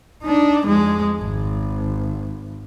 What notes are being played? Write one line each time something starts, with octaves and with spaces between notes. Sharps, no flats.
D4 D#4
F2 G#3
G#1